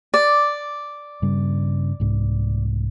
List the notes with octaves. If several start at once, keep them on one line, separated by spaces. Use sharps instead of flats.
D5
G2 C#3 G3
C2 G#2